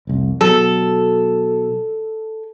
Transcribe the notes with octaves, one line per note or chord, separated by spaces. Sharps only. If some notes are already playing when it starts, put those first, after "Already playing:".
F1 C2
B2 F#3 A4